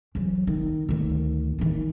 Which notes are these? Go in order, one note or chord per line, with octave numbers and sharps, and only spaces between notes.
E3 F#3
D#3
D2 D#3
D#3 E3